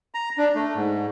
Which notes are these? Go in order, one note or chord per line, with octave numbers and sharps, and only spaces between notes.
A#5
D4
A3
G#2